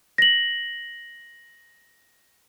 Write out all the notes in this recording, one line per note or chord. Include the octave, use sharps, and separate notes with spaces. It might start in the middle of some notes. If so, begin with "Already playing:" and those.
A#6 F#7